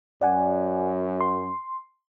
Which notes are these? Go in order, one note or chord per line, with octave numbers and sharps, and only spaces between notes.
F#2 D5 F#5 G#5
C6